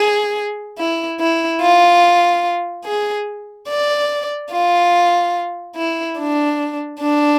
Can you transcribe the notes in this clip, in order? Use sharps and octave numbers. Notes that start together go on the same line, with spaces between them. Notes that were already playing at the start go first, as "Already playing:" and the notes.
Already playing: G#4
E4
E4
F4
G#4
D5
F4
E4
D4
D4